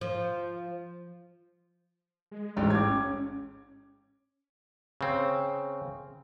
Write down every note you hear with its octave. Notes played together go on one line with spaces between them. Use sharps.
F3
G#3
A1 G#2 G5
D6 G#6
C#4
C#3 C4